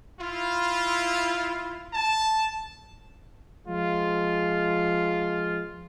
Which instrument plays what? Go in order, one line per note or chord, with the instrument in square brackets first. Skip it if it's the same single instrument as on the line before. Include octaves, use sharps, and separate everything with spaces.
[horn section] E4 F4
A5
[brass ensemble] F3 G#3 F4